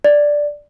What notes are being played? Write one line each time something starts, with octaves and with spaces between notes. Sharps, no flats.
D5